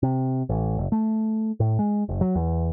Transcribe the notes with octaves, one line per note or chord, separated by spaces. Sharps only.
C3
A1
F#1
A3
A2
G#3
F#1
F#3
E2